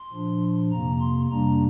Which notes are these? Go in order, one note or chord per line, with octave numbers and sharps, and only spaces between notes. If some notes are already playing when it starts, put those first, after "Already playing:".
Already playing: C6
A#2 F3 D4
F2 C3 A#3 A#5
C6
F2 C3 G3 A#3 D4 A#5